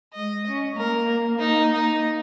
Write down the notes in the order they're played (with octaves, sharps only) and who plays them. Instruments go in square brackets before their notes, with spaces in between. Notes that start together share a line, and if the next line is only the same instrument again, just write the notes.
[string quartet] G#3 [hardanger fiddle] D#5
[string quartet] C#4
[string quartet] A#3 [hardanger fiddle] A#4
[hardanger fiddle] D#4
D#4